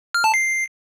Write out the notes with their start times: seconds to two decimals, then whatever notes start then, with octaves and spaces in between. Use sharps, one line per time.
0.14 F6
0.24 A5
0.34 C7